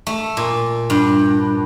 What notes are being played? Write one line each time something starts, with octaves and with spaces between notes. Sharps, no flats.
A3
A#2
G2